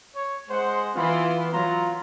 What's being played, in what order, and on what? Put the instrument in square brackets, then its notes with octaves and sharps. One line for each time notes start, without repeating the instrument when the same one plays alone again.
[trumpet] C#5
[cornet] G#3 [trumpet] C5 [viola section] F#5
[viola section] E3 E4 C6 [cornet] B3 [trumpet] F4
[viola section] F#3 [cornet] F4 [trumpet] A#5